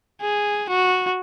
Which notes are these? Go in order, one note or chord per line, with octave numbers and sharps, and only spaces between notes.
G#4
F#4